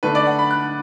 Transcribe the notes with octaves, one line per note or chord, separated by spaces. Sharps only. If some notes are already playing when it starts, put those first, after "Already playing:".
D3 A3 D4 B4
D5
F#5
B5
F#6